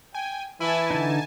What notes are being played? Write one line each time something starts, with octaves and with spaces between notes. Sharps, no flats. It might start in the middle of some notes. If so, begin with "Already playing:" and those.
G5 G#5
E3 E4 G#5 A5
D3 D#4